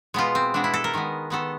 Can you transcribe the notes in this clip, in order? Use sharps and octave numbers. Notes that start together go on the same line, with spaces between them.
B2 G#3 B3 F4
C4
B2 G#3 B3 D4
E4
A4
A#4
D#3 G#3 B3
D#3 G#3 B3 A4